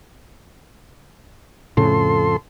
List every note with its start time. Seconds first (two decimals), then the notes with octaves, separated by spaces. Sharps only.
1.77 F2 A2 C#3 A4 C6